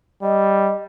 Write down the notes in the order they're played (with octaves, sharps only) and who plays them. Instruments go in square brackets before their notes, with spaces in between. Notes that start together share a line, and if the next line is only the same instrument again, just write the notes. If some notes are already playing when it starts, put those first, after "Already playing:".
[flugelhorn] G3 [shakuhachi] D#5